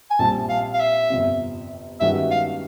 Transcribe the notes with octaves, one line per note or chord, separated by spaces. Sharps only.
G#5
A#1 A#2 G3 C4 A5
F5
F5
E5
G1 F2 C3
G2 D#3 G#3 C#4 F#4 E5
F5